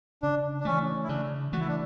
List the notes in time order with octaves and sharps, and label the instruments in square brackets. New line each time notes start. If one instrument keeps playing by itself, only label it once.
[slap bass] C#3 [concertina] D4
[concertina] D4
[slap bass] E3 A3 [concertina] C#4
[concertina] E4
[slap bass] C#3 [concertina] D4
[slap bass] E3 A3 [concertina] F#4
[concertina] E4
D4